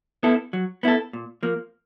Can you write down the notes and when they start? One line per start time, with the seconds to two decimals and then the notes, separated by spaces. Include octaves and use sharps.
0.23 B3 E4 A4
0.53 F#3
0.83 B3 E4 A4
1.13 A#2
1.43 F3 A#3